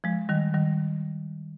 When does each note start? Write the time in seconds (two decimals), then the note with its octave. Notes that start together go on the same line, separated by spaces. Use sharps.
0.04 F3 G#3
0.29 D#3 G3
0.54 D#3 G3